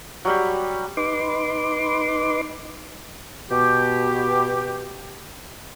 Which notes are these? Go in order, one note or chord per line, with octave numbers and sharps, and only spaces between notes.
F#3 G3 G4
D#4 B4 C6 D6
B2 G4